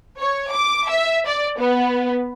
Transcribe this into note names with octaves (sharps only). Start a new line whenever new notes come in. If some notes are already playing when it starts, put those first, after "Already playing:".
C#5
D6
E5
D5
B3